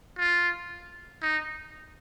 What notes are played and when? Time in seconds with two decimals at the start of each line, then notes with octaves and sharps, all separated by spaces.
0.18 F4
1.22 D#4